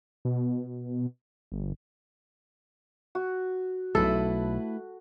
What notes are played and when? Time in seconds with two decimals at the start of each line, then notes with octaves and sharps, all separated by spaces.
0.25 B2
1.52 G1
3.15 F#4
3.95 B1 A3 E4 A4 B4